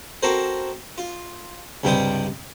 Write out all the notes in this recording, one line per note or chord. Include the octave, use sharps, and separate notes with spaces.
C4 F#4 A4 A#4 C5
F4
C#2 G2 C3 G3 G5 D#6